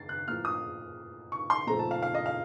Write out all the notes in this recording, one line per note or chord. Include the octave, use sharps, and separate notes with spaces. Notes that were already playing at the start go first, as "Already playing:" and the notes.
Already playing: A6 C7
F#6
A2 F3 A#3 F6
D#6
C#6
C6
A#2 F3 A3 C4 A#5
A5
F5
F5
D#5
F5